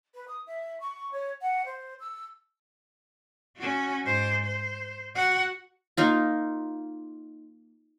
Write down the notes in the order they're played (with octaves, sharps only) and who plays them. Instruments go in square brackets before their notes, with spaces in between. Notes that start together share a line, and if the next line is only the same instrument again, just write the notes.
[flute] B4
D#6
E5
C#6
C#5
F#5
C5
E6
[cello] C#4 F#4
G#2 C5
C5
F#4 F#5
[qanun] A#3 D#4 F4